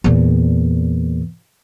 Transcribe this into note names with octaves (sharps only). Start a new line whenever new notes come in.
E2 A#2